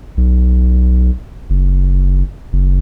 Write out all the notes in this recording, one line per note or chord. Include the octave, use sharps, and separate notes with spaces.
B1
F#1
F#1